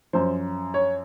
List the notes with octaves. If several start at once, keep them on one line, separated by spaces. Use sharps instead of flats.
F#2 F3 C5
C#5